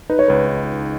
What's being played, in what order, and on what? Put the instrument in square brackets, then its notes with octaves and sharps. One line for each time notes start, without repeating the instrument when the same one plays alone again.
[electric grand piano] D#4 [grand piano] B4
[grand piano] C#5
[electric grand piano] C#2 [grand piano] B4